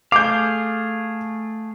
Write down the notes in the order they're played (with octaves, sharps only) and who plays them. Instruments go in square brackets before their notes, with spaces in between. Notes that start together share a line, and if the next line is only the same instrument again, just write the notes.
[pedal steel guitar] A3 G#4 F5 [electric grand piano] D6 G6